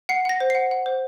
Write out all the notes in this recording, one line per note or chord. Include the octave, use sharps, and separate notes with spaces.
F#5 C7
F#5 A#6
C5
F#5 C7
F#5
C5